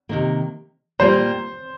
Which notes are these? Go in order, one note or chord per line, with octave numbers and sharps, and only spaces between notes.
C3 D#3 A#3
A#2 G3 A#3 F4 C5